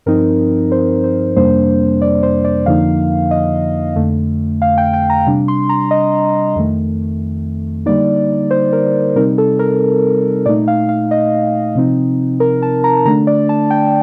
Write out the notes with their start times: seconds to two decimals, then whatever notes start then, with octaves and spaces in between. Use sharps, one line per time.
0.06 G2 F3 C4 D#4 A#4
0.72 C5
1.04 C5
1.36 F2 C3 G3 A#3 D4 C5
2.02 D5
2.23 C5
2.45 D5
2.66 F2 D3 F3 A#3 D#4 F5
3.31 D#5
3.96 F2 D3 A3
4.62 F5
4.78 G5
4.93 G5
5.10 A#5
5.26 C3 G3 D4
5.48 C6
5.69 A#5
5.91 D#5
6.56 F2 D#3 A3
7.86 D3 G3 A#3 D#4 D5
8.51 C5
8.73 A#4
9.16 C3 G3 C4 D#4 A#4
9.38 A4
9.59 A#4
10.46 A#2 A3 D#4 D5
10.68 F5
10.89 F5
11.11 D#5
11.75 C3 F3 C4 D#4
12.40 A#4
12.62 A5
12.84 A#5
13.05 D3 A3 D4 A#5
13.27 D5
13.49 A5
13.70 G5